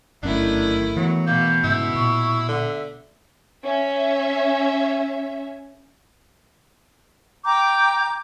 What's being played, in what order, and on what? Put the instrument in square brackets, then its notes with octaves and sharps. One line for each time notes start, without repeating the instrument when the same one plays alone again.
[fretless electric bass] G1 F#2 C#4 [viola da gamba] D#3 A3 E4 [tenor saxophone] D4
[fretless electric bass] E3 B3 [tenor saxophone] F#3
[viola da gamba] B2 [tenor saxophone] A#3 [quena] G6
[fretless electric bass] G#2 C#3 [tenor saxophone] E4
[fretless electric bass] A#2 [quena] C#6
[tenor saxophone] D3 [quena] E5
[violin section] C#4 E5
[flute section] G5 A#5 D6 G6